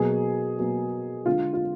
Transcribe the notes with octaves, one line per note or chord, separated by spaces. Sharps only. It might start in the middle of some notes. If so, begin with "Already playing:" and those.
Already playing: B2 F#3 A#3 G#4
B2 F#3 A#3
D3 G#3 F4
F4